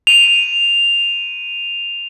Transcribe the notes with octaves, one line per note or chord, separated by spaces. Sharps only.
D#7 F7